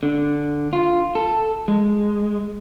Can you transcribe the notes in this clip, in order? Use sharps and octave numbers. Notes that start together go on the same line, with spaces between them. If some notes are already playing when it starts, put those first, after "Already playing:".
D3
F4
A4
G#3